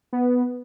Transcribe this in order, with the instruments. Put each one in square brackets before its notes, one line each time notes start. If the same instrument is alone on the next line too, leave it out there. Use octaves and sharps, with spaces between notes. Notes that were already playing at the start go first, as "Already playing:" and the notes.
[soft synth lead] B3